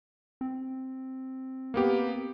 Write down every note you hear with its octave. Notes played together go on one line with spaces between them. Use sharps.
C4
A#3 B3 G4